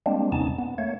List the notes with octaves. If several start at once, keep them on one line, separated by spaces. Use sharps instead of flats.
G3 G#3 A#3 C4 D4
E2 C3 B3 C#4 D#4 A5
B3
A3 A#3 C#5